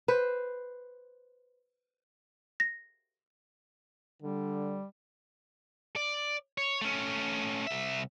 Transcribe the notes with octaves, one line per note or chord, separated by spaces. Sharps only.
B4 C5
A#6
D3 G3
D5
C#5
A3 C#4
C2 E5